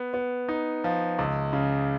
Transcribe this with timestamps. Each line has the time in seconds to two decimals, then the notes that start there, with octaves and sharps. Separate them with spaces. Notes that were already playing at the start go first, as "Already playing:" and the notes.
Already playing: B3
0.14 B3
0.49 D#4
0.84 F3
1.18 C#2
1.53 C#3